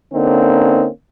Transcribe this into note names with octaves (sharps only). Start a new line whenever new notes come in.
D3 A#3 C4 C#4 D#4